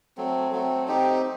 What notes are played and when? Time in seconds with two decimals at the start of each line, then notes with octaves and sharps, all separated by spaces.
0.17 F#3 A3 C4
0.52 F#3 A3 C4
0.88 C4 D#4 G4